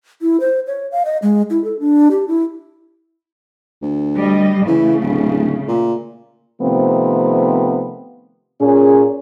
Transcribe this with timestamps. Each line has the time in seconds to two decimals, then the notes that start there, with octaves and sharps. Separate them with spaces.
0.21 E4
0.40 C5
0.67 C#5
0.92 F5
1.05 D#5
1.22 G#3
1.50 E4
1.64 A4
1.80 D4
2.11 G4
2.28 E4
3.82 D2
4.17 G3 D#5
4.66 C#3 E3 A3
5.01 D1
5.68 A#2
6.61 C3 D#3 F3 A3 B3 C4
8.61 A#2 C#4 G#4